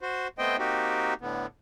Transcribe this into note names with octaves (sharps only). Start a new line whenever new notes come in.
F#4 C5
A3 B3 C4 C5 D#5 G5
A#3 C4 D#4 F#4 G4
A2 D3 B3